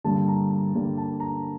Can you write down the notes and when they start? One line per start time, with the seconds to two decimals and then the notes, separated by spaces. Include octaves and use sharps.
0.04 G2 D3 G3 A#3 A5
0.28 A#5
0.51 A#5
0.74 G2 D3 G3 A#3
0.98 A5
1.20 A#5